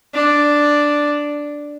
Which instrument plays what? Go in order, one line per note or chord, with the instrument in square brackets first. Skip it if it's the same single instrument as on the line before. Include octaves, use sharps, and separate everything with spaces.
[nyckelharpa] D4